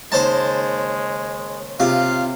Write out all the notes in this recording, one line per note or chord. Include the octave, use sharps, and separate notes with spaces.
D#2 C#3 G#3 D#4 C5 A5
C3 F4 F5